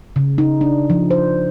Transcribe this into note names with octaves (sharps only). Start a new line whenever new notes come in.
C#3
D#4
D4
F3
C5